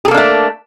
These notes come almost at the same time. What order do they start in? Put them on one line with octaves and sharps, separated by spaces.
G#4 A4 A#3 D4 A3